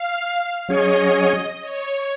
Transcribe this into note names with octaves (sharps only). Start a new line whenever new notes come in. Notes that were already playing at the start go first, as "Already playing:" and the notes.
Already playing: F5
F#3 C#4 G#4 C#5 D#5
C#5